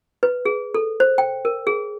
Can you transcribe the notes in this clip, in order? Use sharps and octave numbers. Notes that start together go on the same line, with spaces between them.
B4
G#4
A4
C5
G5
A#4
G#4